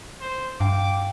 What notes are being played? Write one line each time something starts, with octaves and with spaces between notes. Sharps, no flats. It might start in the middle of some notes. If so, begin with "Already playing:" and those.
C5
G2 F5 G5 D6